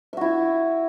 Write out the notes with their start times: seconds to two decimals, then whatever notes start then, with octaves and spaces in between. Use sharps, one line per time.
0.13 E5
0.17 F#4
0.21 E4